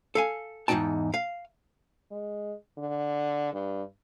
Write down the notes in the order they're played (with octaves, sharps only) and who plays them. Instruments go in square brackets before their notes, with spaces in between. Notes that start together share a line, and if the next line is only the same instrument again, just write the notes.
[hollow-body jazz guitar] A4 F5 G#5
E2 G#2 D4 D#4 G5 A5
F5
[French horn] G#3
D3
G2